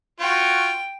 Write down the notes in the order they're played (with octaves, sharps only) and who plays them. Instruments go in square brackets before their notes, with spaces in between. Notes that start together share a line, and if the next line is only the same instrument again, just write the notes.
[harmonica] F4 F#4 [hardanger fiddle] G5